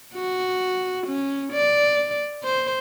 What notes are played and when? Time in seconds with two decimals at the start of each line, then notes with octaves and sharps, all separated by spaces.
0.14 F#4
1.07 C#4
1.53 D5
2.44 C5